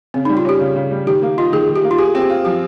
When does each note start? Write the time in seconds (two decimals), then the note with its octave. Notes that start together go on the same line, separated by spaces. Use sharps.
0.14 C#3 C4
0.25 D#4
0.29 G3
0.37 F4
0.45 C#4 G4
0.60 C#3
0.76 C#3
0.91 G3
1.06 D#3 G4
1.22 A#3
1.38 D#4 F4
1.52 D#3 G#4
1.68 D#3
1.76 G4
1.84 A#3
1.91 F4
1.98 G4 G#4
2.15 C4
2.22 G4
2.30 F4
2.45 F3 G4